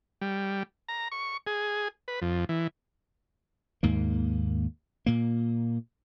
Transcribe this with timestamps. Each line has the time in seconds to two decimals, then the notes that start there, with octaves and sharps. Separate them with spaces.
0.21 G3
0.88 A#5
1.12 C#6
1.47 G#4
2.08 B4
2.22 F2
2.49 E3
3.83 D#2 G#2 A#3
5.06 A#2 A#3